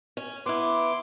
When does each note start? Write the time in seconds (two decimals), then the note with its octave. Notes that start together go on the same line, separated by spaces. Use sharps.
0.17 C#4
0.46 B3 E4 C6 D6